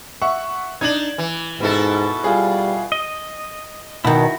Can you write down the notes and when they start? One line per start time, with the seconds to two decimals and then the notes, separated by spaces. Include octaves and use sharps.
0.22 E5 F#5 C#6
0.81 D4 D#4 G#6 F#7
1.18 E3
1.60 G#2 B2 E4 A4
2.24 G3 F4 G#4
2.92 D#5
4.05 B2 D#3 E4 F#4